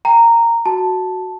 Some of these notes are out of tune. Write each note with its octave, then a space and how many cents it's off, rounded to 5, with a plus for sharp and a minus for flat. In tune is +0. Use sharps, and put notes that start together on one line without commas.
G5 +5 A#5 -10
F#4 +0 A5 +0